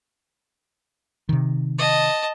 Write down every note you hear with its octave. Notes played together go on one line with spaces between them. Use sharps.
C3 D#3
D#5 A5